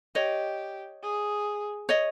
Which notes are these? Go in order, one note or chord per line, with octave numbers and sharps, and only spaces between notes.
G4 C#5 D#5
G#4
C#5 D#5